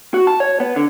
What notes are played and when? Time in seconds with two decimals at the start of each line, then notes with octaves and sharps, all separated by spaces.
0.14 F#4
0.27 A5
0.40 C#5
0.60 B3
0.76 D3